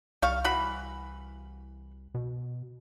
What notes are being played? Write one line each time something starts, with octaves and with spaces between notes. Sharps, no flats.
C2 G3 F5 C#6
E3 F#4 B5
B2